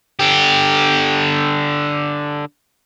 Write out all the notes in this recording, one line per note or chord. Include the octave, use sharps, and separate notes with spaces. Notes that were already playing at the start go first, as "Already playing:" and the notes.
D3 G4